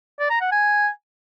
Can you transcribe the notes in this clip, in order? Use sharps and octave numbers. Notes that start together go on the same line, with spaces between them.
D5
A#5
F#5
G#5